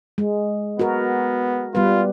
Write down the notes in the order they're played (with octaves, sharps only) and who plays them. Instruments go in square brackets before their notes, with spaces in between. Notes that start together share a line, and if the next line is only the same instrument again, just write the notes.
[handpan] G#3
[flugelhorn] B3 [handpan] F#4 A#4
[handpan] G3 B3 B4 [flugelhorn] F4